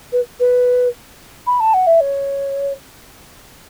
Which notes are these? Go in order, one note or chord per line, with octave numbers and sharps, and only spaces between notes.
B4
B4
B5
A5
F#5
E5
C#5